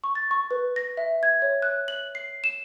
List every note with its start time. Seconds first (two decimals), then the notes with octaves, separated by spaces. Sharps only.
0.04 C#6
0.15 A6
0.31 C#6
0.51 B4
0.76 A#6
0.97 E5
1.23 G#6
1.42 C#5
1.62 F#6
1.88 F#7
2.15 C7
2.44 E7